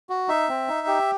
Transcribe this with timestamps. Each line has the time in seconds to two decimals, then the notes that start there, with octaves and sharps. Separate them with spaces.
0.09 F#4
0.28 D#4 E5
0.49 C4
0.68 D#4
0.87 G4